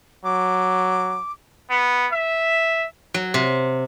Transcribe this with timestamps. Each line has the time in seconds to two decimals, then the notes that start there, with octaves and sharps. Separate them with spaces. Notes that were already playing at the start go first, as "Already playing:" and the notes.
0.25 F#3 D6
1.70 B3
2.13 E5
3.14 F#3
3.34 C3